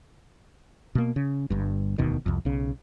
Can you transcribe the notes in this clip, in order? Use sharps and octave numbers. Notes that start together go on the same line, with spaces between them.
B2 A#3
C#3
G1 G2
E1 D2 B2 D#3
C2 F2
B1 C#3